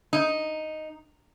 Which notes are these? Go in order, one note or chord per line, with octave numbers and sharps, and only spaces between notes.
D#4